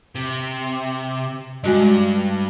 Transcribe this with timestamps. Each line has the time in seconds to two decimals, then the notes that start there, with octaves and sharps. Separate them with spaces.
0.15 C3
1.64 G2 G#3 F#4 D#5